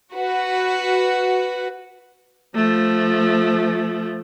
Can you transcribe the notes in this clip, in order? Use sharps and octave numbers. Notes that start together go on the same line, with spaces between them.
F#4 B4
F3 A3